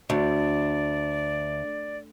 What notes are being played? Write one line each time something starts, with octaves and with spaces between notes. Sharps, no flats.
D2 D5